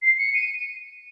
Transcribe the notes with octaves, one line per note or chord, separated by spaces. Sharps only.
C7
C#7
D#7